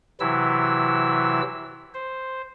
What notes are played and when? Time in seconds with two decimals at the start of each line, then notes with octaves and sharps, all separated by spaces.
0.20 C3 E3 F#3 E4 E6
1.94 C5